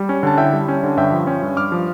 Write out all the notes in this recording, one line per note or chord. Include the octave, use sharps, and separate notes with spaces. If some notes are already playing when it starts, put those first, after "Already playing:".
Already playing: G3
C#4
D3 A5
E4 E5 G5
G3
C#4
D3
G2 E5 G5
F3
C#4
G2
G2 D6 F6
F3